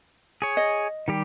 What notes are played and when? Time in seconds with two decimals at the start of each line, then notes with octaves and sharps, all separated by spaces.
0.42 G#4 C#5
0.57 D#5
1.08 D#3 G3 G4